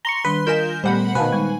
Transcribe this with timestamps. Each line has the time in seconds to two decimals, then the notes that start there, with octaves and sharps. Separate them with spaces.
0.05 A#5 C6 C#6 G7
0.24 D#3 G3 D4 B4
0.47 F4 A#4 D#5 G#5 G6 B6 E7
0.84 A#2 G3 A3 B3 C5 F#5 B5
1.15 B2 D#3 B4 C5 F5 G#5 A5
1.32 G3 G#3 D#4